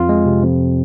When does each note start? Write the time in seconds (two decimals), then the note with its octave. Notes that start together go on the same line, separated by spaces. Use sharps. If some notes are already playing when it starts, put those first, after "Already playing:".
Already playing: F2 F4
0.09 G#3
0.25 C3
0.43 F2